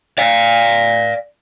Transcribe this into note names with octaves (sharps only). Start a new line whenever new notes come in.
D5 F5